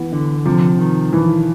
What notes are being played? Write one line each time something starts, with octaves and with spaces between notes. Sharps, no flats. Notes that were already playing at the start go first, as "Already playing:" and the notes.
Already playing: E3 B3
D3
C3 F3
D#3
B1 E3